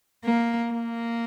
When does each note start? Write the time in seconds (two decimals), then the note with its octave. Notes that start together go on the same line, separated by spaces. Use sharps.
0.25 A#3
0.72 A#3